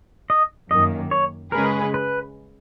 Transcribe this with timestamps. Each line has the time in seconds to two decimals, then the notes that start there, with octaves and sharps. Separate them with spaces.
0.30 D#5
0.70 F#2 D#3 A#3 D#5
1.11 C#5
1.52 C#3 G#3 C#4 G#4 A#4 B4
1.94 B4